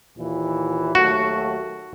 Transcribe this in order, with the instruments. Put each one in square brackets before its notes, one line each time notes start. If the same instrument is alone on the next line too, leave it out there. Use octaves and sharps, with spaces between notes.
[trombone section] D#2 A#2 E3
[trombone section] D#2 F#3 A3 [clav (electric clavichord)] F#4